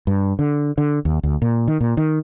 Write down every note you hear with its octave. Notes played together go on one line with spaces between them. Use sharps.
G2
D3
D3
D#2
D2
A#2
D#3
A#2
D#3